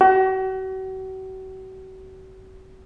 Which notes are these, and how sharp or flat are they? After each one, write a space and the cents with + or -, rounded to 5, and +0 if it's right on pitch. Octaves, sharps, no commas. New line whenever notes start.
F#4 +40